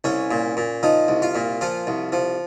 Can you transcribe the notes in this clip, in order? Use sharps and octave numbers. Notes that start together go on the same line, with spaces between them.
C2 C#4
A#2
A#2
F3 D#4
C2
F4
A#2
F3 F4
C2
F3